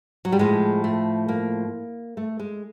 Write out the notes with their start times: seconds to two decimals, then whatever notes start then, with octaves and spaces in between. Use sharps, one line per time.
0.25 F#3
0.32 G3
0.39 A2 F3 G#3
0.84 A3
1.28 A#3
2.17 A3
2.40 G#3